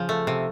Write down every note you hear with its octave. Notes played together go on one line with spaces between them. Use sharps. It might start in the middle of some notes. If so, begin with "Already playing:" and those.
Already playing: C#3 F3
A3
C3